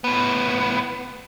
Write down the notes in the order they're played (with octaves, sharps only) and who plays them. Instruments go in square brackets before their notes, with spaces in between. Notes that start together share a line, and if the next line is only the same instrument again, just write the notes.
[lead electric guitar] A2 B3